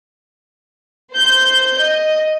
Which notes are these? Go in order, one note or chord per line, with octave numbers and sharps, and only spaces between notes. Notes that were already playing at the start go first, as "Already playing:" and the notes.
C5 G6
D#5